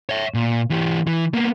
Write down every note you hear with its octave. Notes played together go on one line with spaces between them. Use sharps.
C#5 E5
A#2
E3 G4
E3
A#3 B3